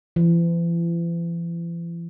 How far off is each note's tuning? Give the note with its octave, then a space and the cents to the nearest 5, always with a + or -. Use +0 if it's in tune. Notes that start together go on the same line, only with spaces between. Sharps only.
E3 +45